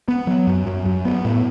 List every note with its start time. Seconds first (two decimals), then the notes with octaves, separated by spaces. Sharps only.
0.08 B3
0.27 F#3
0.47 F#2
0.67 F#2
0.86 F#2
1.05 B3
1.25 A2